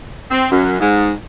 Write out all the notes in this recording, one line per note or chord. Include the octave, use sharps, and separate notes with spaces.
C4
F#2
G#2